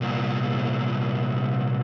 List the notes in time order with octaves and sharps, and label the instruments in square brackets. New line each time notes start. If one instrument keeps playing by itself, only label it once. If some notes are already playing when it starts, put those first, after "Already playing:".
[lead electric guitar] C2 A#2